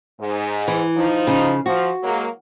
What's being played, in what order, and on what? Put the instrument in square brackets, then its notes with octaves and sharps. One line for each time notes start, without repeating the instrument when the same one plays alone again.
[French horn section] G#2
[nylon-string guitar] E3
[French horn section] F3 D#4
[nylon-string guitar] C#3
[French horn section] F3 [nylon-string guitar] F#4
[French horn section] F#3 G#3 A#3